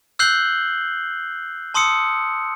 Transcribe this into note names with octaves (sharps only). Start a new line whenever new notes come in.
E6 F#6 G6 C7 F#7 G7
A5 C6 D#6 E6 C#7